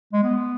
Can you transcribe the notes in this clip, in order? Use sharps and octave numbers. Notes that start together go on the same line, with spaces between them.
G#3
B3